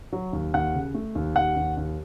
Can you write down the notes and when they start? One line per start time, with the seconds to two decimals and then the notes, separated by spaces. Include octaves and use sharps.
0.12 F#3
0.33 D#2
0.54 D#2 F#5
0.75 C#3
0.94 A3
1.15 D#2
1.36 D#2 F#5
1.56 D#2
1.77 D#2